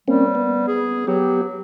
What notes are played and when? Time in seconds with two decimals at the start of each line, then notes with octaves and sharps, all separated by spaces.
0.08 G3 A#3 C4 C#4
0.35 B3
0.68 G#4
1.07 F#3 B3 G4